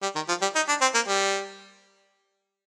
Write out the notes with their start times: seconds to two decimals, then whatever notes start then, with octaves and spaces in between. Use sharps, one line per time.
0.02 G3
0.15 D#3
0.28 F3
0.42 G3
0.55 D#4
0.68 D4
0.81 C4
0.94 A#3
1.08 G3